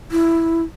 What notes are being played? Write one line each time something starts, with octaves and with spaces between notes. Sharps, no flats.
E4